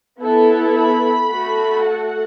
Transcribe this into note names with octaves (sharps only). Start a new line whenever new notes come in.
B3 E4 A4
B5
A3 F#4 A4
F#5